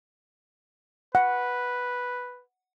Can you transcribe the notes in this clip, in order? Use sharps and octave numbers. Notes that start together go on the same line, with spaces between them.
B4 F#5